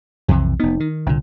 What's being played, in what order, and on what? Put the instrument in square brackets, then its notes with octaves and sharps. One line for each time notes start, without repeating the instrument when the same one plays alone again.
[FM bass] B1 [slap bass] F2 C3 E3
[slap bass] F1 B3 [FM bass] D#4
[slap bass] D#3
[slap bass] C2 A#2 [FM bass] D3